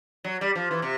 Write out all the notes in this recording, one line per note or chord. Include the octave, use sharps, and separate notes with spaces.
F#3
G3
F3
E3
C3